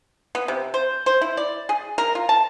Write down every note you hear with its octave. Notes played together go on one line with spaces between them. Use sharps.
B3
C3
C5
C5
E4
D5
G#4
A#4
F4
A5